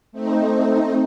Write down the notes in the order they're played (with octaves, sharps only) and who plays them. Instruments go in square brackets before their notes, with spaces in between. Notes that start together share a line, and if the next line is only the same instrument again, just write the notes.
[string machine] A3 C4 D#4